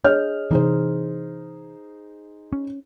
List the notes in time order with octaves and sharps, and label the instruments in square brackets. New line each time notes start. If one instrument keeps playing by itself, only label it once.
[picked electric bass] D4 [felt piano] G#4 D#5 F6 [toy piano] C#5
[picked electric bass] C3 E3 [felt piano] D#4 G#4 C5
[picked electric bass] C#4